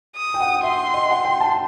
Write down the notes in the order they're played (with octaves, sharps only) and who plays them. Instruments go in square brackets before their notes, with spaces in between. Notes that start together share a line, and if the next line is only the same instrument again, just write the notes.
[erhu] D#6
[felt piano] G5
F#5
[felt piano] E5 [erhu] C6
[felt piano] D#5
F#5
G5
A5